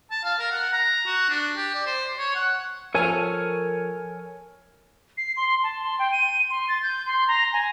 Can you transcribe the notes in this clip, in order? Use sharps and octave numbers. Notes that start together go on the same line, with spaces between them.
A5
F5
A#4
F#5
A#5
F#4
D4
G4
D5
C5
C#5
F#5
F3 A4 A#4 C#5 G#5 F6
C7
C6
A5
C6
G5
D#7
C6
A6
G6
C6
A#5
G#5